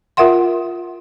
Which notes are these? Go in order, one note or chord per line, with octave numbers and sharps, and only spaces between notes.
F4 A#4 E5 F#5 C6